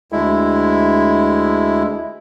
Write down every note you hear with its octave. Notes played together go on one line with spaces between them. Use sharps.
D2 G#3 E4